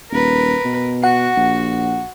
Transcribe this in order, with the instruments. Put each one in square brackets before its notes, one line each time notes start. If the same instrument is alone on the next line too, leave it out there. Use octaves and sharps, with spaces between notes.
[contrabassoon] D#1 [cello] A#4 B4
[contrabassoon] B2
[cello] F#4 [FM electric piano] F#5
[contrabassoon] A#1